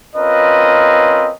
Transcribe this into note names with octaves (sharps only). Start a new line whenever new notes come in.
C4 C#4 F4 A#4 B4 D#5